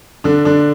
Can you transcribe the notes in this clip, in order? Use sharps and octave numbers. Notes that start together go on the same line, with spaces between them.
D3 D4
D3 D4